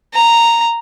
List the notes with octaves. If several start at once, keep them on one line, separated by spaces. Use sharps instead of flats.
A#5